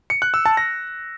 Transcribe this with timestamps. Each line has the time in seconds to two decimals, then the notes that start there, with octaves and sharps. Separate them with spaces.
0.10 C#7
0.22 F#6
0.34 E6
0.45 A5
0.57 A#6